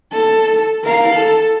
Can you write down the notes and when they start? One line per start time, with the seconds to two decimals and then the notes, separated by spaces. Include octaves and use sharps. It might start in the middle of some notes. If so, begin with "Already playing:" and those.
0.12 A4
0.83 A#4 F5
1.14 A4